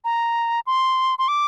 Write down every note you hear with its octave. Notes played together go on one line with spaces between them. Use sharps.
A#5
C6
C6
D6